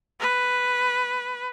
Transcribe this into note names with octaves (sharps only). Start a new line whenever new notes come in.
B4